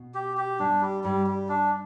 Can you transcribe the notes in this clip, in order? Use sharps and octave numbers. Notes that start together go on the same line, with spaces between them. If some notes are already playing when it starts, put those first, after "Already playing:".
Already playing: B2
G4
G4
G2 D4
G3
G2 G3
G3
D4